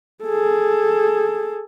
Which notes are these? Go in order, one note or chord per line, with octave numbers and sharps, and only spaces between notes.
G#4 A4